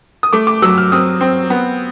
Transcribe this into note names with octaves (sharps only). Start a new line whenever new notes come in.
D#6
A3 D6
D6
F#3 E6
F6
C4 D#6
C4
B3